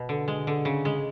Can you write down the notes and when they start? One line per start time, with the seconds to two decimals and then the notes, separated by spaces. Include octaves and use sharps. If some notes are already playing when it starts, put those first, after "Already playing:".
Already playing: B2
0.09 D3
0.28 G#3
0.47 D3
0.65 C#3
0.85 G#3